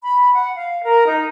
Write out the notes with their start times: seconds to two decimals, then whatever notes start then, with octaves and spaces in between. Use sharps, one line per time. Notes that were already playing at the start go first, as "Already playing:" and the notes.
0.02 B5
0.33 F#5
0.56 F5
0.84 A#4
1.07 D#4